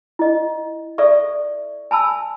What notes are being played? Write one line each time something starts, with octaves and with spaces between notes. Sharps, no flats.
E4 D#5
A4 D5 E5 C#6
G#5 A5 B5 E6